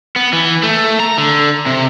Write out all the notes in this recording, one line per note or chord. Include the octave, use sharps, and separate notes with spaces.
B3
E3
A3
A#5
D3
C3